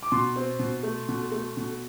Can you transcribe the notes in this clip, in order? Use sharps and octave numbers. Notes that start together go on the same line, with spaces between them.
D6
B2 C6
C4
B2
A3
B2
A3
B2